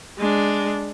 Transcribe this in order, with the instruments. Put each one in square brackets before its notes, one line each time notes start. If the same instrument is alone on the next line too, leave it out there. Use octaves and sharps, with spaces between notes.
[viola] G#3 D4